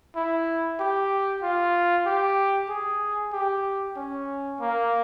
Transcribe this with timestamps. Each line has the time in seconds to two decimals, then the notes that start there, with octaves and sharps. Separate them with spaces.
0.16 E4
0.79 G4
1.43 F4
2.06 G4
2.69 G#4
3.33 G4
3.96 C#4
4.60 A#3